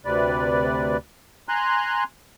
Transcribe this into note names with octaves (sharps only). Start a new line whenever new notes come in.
D2 C3 B4 D5
G#5 A#5 C6 F#6